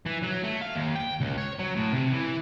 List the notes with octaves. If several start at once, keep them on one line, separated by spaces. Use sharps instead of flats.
E3
F#3
A3
F5
D#2
G5
C#2
C#5
F#3
A2
C3
E3